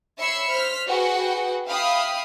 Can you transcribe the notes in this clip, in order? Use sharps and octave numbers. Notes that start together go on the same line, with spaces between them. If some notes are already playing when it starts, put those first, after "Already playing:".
C#5 E5 B5 E6 C7 C#7
C5 F6 B6
F#4 G#4 B4 F#5 G5
E5 F5 G5 B5 D#6 F6